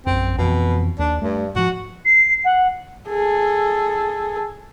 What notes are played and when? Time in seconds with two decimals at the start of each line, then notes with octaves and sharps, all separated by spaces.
0.06 A#1 F#2 C4
0.38 F2 B2 E3
0.99 D#2 D4
1.22 G2 A3
1.56 G#2 F3 F#4
2.05 C7
2.44 F#5
3.09 G#4 A4